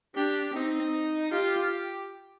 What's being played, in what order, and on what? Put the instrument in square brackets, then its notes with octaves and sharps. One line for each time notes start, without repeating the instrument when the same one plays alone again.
[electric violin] D4 [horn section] G4
[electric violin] C4 [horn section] D#4
[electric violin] F4 [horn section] G4